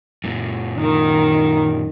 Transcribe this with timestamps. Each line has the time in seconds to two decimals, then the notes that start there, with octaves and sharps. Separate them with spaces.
0.24 F#2 A#2
0.78 D#3